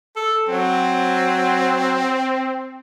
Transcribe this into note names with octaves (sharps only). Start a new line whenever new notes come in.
A4
F#3 C4